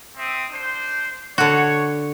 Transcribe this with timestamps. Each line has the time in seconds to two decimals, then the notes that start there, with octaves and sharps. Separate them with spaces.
0.17 C4 E5 D#6
0.52 D4 C5
1.38 D3 F#4 C#5